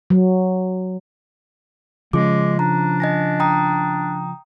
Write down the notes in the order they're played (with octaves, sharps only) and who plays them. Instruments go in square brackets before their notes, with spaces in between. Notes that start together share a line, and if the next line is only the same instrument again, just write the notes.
[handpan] F#3
[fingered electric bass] C#3 F3 [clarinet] G#3 [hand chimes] C#4 G#4 D6
[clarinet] D4 [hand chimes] A#5
[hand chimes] D#5 G#5 A#6
G5 A#5 D#6